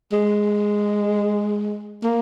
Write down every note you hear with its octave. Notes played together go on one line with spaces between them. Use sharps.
G#3
A#3